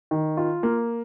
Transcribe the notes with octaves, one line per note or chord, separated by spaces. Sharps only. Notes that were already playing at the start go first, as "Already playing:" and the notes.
D#3
F4
A#3